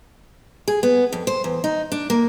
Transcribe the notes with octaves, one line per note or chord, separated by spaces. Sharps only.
G#4
B3
F2
C5
E2
D#4
D4
A#3